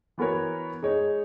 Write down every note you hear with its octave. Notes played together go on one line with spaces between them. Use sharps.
E3 B3 F#4 A#4 C#5
G#3 D#4 G#4 C#5